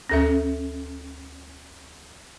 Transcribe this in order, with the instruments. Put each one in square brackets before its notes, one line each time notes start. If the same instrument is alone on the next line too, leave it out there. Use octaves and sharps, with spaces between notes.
[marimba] D2 A#6 [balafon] C#4 A4 E5